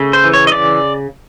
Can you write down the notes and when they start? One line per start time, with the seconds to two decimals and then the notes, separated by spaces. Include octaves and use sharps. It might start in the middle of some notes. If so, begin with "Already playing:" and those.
Already playing: C#3 A3
0.13 C5
0.24 E3
0.34 C#5
0.47 D#5
0.52 C#3 D5